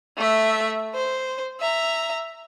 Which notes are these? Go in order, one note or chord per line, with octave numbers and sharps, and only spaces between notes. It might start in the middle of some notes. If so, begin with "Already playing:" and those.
A3 E5
C5
E5 A#5